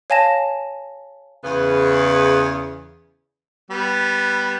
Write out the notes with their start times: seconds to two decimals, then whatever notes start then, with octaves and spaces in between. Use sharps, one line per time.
0.10 C#5 F5 G#5 A5 A#6 E7
1.44 E2 C#3 B4
3.71 G3 B3